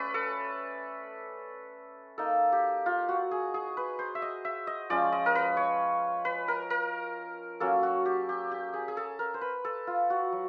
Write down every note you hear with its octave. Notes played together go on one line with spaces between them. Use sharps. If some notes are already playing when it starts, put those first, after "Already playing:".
Already playing: A3 C#4 B4 D5
A4
A#3 D#4 A4
G4
F4
F#4
G#4
G#4
B4
C5
E5
D#5
E5
D#5
F3 G#3 C#4 F4 D5
D#5
A#4
B4
C#5
B4
A#4
A#4
F#3 A#3 C#4 A4
F#4
G4
G4
G4
G#4
G#4
A4
A#4
C5
B4
A4
F4
F#4
F#3